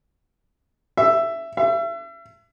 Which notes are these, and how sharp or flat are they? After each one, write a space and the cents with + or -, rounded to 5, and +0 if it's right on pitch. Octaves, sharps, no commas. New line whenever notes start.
E5 +10
E5 +35